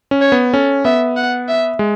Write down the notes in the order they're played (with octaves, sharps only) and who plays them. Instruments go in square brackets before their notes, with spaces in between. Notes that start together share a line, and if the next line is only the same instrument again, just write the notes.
[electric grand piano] C#4
[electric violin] C#5
[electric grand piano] B3
[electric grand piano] C#4 [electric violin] A4
[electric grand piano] B3 [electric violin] E5
[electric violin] F#5
E5
[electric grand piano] G#3